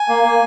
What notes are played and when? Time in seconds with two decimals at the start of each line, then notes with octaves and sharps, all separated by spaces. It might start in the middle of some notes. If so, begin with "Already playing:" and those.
Already playing: G#5
0.09 A#3
0.24 A#3